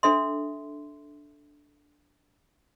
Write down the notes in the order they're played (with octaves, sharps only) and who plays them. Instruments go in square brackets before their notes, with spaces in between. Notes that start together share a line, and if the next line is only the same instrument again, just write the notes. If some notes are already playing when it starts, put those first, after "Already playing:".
[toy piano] D4 A4 E5 C6